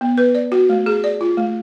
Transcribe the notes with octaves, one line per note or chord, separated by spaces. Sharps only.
B3
B4
D5
F#4
A3
G#4
D5
F4
A3